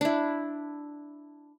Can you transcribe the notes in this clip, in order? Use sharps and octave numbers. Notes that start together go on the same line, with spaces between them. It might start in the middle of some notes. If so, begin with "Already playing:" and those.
D4 E4